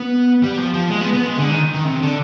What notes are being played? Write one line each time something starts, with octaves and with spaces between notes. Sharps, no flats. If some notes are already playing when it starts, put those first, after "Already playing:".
Already playing: B3
G3
F3
F3
G#3
B3
B3
G#3
D3
D#3
D#3
C3
D3